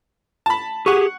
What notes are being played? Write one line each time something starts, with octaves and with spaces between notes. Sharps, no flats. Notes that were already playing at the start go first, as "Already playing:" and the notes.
A5 B5
G4 G#4 F#5 C#6